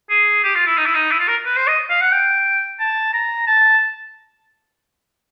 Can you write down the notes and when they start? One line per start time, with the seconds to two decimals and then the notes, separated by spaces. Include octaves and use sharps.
0.10 G#4
0.44 G4
0.55 F4
0.67 E4
0.78 D#4
0.86 E4
0.95 D#4
1.11 E4
1.19 F4
1.28 A#4
1.45 B4
1.56 C5
1.67 D#5
1.90 F5
2.01 F#5
2.12 G5
2.79 A5
3.14 A#5
3.47 A5